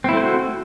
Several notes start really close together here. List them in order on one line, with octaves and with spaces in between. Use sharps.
C4 E4 A3 C5 F#4